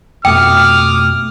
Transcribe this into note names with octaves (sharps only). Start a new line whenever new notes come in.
F2 B2 A3 G5 D6 D#6 F6